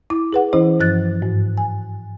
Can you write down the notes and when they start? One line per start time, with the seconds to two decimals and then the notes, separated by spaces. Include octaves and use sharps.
0.10 E4 D6
0.33 G#4 B4 F#5
0.53 E3 C#4 E4 C5
0.79 G2 F3 F#6 A6
1.22 G#2
1.58 G#5